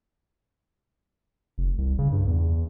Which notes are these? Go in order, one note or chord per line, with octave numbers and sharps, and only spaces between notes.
F1
C2
C#3
G2
E2